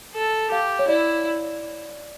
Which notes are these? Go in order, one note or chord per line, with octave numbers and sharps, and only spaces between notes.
A4
G4 F5
C#5
E4 D5